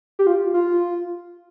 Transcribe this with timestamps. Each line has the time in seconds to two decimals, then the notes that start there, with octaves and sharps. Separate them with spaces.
0.19 G4
0.27 F4
0.54 F4